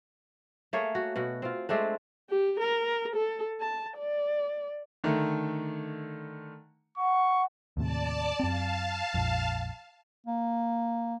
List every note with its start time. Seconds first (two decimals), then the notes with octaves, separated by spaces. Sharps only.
0.73 A3 A#3 G#4 C#5
0.95 F#4
1.16 B2 F#4
1.42 C4 F4
1.69 G#3 A3 C4 D4
2.30 G4
2.60 A#4
3.16 A4
3.61 A5
3.98 D5
5.04 D3 D#3 A3
6.98 F#5 C#6
7.77 D#2 A2 C3 D5 A5
8.40 F#2 C4 F5 A5
9.14 A#1 F2
10.27 A#3